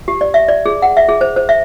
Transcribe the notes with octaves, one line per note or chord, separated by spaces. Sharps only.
G4
D5
E5
D5
G#4
F#5
E5
G#4
C5
C5
E5